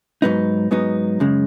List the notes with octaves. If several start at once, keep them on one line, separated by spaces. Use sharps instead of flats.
G#2 F#3 B3 D#4
G#2 F#3 B3 D#4
F#2 C#3 G#3